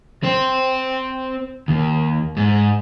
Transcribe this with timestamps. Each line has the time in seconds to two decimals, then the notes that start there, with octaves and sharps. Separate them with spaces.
0.23 C4 C5
1.68 D#2
2.37 G#2